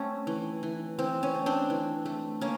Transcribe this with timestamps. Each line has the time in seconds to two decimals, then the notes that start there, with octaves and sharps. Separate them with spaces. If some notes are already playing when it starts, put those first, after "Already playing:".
Already playing: A3 C4 C#4
0.27 E3
0.63 E3
0.98 E3 C4
1.23 C#4
1.34 A3
1.46 C4 D4
1.70 E3
2.06 A3
2.41 A#3 C#4